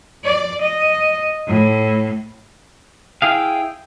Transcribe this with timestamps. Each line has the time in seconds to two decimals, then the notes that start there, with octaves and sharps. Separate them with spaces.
0.25 D5
0.62 D#5
1.47 A2
3.22 E4 G#4 F5 G5